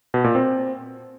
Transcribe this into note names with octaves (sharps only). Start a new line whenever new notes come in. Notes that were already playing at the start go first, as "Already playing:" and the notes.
B2
A#2
C4